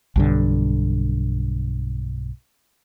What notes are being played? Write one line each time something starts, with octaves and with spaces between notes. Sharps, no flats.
B1 G2 D3